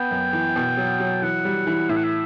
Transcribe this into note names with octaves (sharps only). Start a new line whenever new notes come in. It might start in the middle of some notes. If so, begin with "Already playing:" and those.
Already playing: B3 G5
F#2
E3
B2
F#3
F#3
E3 F#5
G3
E3
A2 E5
F#5
E5